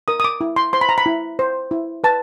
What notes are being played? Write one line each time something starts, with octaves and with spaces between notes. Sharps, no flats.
A#4 D#6
D#6
D6
E4
C6
C5 C6
B5
A#5
B5
E4
C5
E4
B4 A5